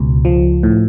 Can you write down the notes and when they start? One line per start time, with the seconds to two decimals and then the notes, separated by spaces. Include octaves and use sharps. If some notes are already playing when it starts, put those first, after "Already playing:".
Already playing: C#2 B2
0.25 F3
0.63 A2